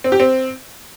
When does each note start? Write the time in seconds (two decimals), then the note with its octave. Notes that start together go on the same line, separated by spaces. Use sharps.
0.04 C4
0.12 G4
0.20 C4